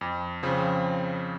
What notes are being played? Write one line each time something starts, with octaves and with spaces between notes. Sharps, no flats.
F2
C#3 F3 C4